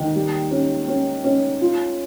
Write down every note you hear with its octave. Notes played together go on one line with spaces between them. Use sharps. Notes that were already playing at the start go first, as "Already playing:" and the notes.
Already playing: D#2 D#3
G3
C#4
C#4
C#4
F4